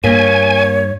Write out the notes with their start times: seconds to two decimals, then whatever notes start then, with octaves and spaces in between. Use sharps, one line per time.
0.04 G2 A#3 C#5 G#5